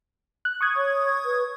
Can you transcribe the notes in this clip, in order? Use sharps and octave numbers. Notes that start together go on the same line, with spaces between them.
F#6
C#6 D#6 G#6
C#5
B4